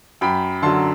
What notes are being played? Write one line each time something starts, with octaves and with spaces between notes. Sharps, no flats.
F#2 G5 B5
D3 F#3 A5 C6